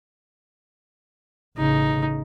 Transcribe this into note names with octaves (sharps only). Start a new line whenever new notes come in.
A1 C#3 D#4